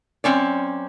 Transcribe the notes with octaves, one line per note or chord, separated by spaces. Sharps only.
F#2 F3 C4 C#4 D5